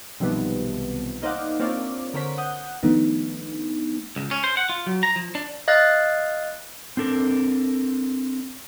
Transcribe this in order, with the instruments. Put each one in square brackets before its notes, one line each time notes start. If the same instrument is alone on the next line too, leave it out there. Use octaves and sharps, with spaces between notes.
[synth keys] B1 C3 D#3 F3 G3 B3
A#3 D#4 C5 D5 F5 F#5
A#3 C4 D4 F4 C#5 D5
D3 A#4 C5 C#5 B6
F#5 D#6 G6
[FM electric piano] D#3 F3 A3 B3 D4 D#4
[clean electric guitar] C#2
C#4
C5
F#5
F4
F#3
A#5
F3
D4
[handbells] D#5 F5 F#6 A6
[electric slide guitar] C4 D4 A4 A#4